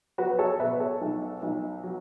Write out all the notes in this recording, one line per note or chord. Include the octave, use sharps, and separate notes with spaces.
F#3 F#4 B4
A4 C#5
B2 B4 E5
A4 C#5
B1
B1
F#3